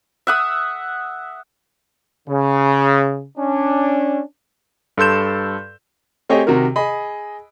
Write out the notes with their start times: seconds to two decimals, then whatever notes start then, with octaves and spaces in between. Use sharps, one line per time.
0.27 E5 F#5 D#6
2.28 C#3
3.37 C#4 D4
4.98 G2 A4 C6 G6 E7
6.29 A3 C4 G4 G#4 C#5 D#5
6.47 C3 D#3 F#4 A#4
6.76 G#4 D#5 B5